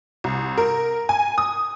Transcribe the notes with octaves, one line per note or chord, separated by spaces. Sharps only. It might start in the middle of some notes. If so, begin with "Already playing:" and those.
C2
A#4
G#5
D#6